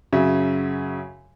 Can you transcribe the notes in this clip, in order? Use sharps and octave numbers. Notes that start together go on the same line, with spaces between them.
F#2 C#3 E5